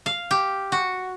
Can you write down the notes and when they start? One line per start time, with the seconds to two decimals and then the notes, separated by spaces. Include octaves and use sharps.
0.06 F5
0.31 G4
0.72 F#4